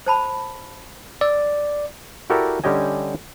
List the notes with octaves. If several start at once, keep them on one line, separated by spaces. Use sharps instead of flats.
C5 A5 B5
D5 E6
E4 F#4 G4 A4 A#4 D5
D3 G3 C#4 G4 D#5 G#5